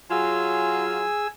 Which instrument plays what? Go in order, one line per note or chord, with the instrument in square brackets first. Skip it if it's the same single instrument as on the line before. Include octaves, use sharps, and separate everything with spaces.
[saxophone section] F#3 F4 [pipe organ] G#4 G#5 E6